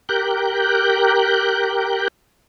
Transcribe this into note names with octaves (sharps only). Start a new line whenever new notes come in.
G4 A#4 F#6 G6